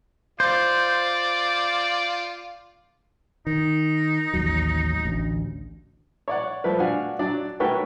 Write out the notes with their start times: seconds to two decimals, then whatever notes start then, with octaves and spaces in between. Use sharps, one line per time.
0.40 F4 C5 D5
3.47 D#3 D#4
4.34 A1 D#2 F#3
5.05 A1 D2
6.28 C#5 D5 F#5
6.64 F3 A3 B4
6.80 D4 F#4 F5 F#5 G#5
7.19 F#3 D4 D5
7.60 A3 F#4 A#4 B4 C#5 G5